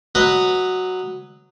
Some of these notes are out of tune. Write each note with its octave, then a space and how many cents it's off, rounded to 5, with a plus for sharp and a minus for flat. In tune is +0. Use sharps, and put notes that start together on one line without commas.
F#3 +0 B4 +0 D#5 -10